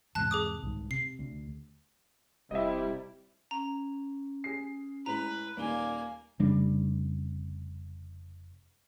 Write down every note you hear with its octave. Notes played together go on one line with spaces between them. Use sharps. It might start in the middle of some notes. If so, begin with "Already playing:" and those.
E2 G#2 C3 A5 F#6
G#4 D6 D#6
C2 G#2 D#3
C3 C7
D2
E1 C3 G3 E4 D#5 E5
C#4 A#5
G#4 C7
A2 G#3 B4 A#5
D#1 A#3 D#4 D5 G#5 G7
F1 C#3 G3 D4